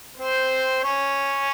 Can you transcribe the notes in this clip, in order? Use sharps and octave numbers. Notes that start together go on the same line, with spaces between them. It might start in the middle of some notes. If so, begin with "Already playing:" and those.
C4 C5
C#4 C#5